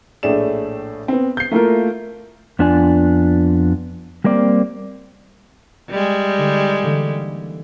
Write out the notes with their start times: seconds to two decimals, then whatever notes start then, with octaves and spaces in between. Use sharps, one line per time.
0.23 A#1 A2 A3 G#4 D5 E7
1.08 B3 C4
1.37 G6 C7
1.51 A3 A#3 E4 F4 A#4
2.59 F2 B3 D4 F4 D5 G#5
4.24 G3 A#3 C4 D5
5.90 G3 G#3
6.38 D3 D#4
6.82 D3 E3 A#3